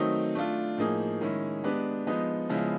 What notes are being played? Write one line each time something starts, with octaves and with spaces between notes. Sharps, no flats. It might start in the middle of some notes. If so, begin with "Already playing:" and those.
Already playing: D#3 F#3 A3 C4 D#4
A3 D4 F4
A2 F3 A#3 D#4 G#4
D#3 G#3 C#4 E4
G#3 B3 D4 G4 B4
F3 G#3 B3 D#4
C#3 F3 G#3 B3 E4